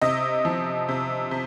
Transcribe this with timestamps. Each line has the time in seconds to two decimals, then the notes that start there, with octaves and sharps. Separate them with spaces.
0.02 C3 D#5
0.45 F3
0.89 C3
1.31 C3